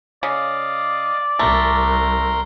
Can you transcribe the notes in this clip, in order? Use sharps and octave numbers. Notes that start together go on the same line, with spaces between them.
C#3 D5 D#5 F5
C2 A3 A#4 A#5 C6